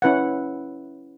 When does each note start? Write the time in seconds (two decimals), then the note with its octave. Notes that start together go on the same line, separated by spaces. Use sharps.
0.02 C#4 E4 B4 F#5